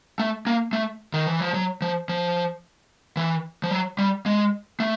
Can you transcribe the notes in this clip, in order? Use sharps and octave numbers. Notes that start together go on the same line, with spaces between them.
A3
A#3
A3
D#3
E3
F3
F#3
F3
F3
E3
F3
F#3
G3
G#3
A3